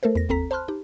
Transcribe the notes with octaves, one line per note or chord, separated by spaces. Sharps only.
A3 A4 A#4 C5
E2 A#6
G1 D#2 C4 A4 A#5 B6
C5 A5 B5 C6 F6 F#6
D#4 G4